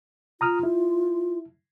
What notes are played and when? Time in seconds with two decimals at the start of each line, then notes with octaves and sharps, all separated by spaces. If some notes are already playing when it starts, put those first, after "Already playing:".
0.41 F4 A#5 D#6 F6
0.63 E4